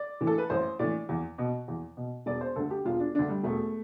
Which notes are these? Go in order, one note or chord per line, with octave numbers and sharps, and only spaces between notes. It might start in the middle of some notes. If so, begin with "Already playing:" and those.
Already playing: D5
A2 E3
A4
B4
A1 C5
A2 E3 D5
E2
B2
E2
B2
E1 D5
C5
D2 D3 A4
G4
E1 F4
D4
D2 D3 D4
G3
E1 A3